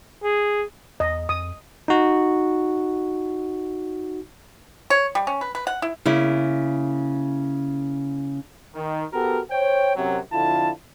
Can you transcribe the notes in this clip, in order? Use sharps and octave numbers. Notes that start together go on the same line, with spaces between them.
G#4
E2 D#5
F2 D#6
D#4 F#4
C#5
G3
C#4
B4
B4
F#5
E4
C#3 A#3 E4
D#3
B3 F#4 G4 A4 A#4
C5 C#5 G5
F#2 C3 F#3
F2 D3 E4 F4 A5